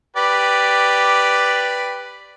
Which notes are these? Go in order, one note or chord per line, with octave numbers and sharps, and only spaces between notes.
G4 B4 D5